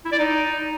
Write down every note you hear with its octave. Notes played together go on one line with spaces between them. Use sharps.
E4
D5
D#4